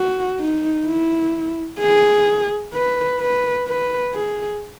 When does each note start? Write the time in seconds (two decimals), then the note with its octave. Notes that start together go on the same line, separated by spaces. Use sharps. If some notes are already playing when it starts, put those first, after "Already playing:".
Already playing: F#4
0.40 D#4
0.87 E4
1.80 G#4
2.74 B4
3.20 B4
3.67 B4
4.14 G#4